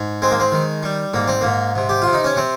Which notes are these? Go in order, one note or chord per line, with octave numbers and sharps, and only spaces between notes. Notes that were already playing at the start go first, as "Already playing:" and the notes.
Already playing: G#2
G#3 C4
A#3
C4
D#3
G3
G#2 A#3
C4
G#2 A#3
C3
G4
C3 F4
D#4
C#4
C3 C4